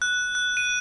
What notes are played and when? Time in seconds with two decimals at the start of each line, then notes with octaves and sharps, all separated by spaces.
0.02 F#6
0.35 F#6
0.57 D#7